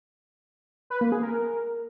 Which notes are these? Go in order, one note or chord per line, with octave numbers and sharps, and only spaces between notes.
B4
A#3
G#4
A#4